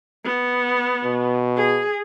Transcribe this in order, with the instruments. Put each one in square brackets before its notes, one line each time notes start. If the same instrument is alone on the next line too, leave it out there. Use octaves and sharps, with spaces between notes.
[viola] B3
[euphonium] B2
[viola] G#4